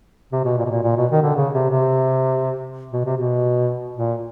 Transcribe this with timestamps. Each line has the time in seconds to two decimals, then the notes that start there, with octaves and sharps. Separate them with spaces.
0.32 C3
0.44 B2
0.58 A#2
0.66 B2
0.71 A#2
0.83 A#2
0.97 B2
1.11 D#3
1.22 D3
1.36 C#3
1.53 C3
1.70 C3
2.92 B2
3.05 C3
3.17 B2
3.96 A#2